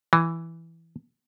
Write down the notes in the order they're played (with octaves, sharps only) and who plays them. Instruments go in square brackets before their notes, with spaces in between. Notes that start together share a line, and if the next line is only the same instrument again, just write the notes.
[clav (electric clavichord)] E3